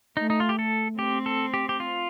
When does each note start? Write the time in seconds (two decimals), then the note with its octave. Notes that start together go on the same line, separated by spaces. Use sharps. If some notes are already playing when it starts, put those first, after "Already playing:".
0.17 A3 D#4
0.30 D#4
0.40 F4
0.49 G4
0.59 A4
0.99 C4 G4
1.26 A4
1.54 G4
1.69 G4
1.80 F4